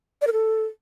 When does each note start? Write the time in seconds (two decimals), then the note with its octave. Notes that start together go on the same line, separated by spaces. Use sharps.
0.22 D5
0.27 A#4
0.33 A4